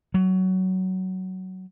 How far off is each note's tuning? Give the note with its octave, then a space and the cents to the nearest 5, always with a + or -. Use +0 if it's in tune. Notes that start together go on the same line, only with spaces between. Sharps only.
F#3 +15